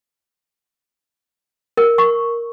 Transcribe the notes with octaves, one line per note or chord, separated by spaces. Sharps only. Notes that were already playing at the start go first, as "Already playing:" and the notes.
A#4
C#6